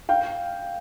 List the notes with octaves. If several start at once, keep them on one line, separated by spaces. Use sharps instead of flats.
F5 G5